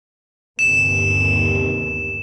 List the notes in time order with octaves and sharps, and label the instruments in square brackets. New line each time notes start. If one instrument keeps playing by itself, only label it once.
[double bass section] G1 D#2 C3 [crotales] E7